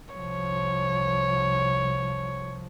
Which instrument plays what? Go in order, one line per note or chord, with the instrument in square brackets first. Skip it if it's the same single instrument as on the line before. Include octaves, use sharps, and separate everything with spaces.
[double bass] C2 F3 [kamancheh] C#5